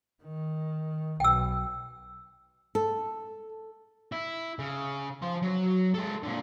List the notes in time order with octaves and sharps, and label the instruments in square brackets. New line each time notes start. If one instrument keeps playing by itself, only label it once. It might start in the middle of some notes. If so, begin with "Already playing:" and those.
[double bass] D#3
[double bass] B1 [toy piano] G5 E6
[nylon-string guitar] A4
[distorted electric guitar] E4
C#3
F3 C6
F#3
G#3 A4
A#2 D3